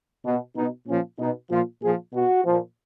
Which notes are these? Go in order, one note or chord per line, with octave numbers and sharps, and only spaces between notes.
B2
B2 D#4
A#2 F3 C#4
B2 D#4
A#2 F3 F4
A#2 F3 G#4
B2 F#4
A#2 F3